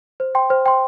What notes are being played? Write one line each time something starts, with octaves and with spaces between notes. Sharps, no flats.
C5
G5 C6
C5
G5 C6